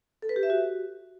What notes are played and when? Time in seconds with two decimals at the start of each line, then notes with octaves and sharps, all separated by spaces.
0.22 A4
0.29 B4
0.36 G4
0.43 E5
0.50 F#4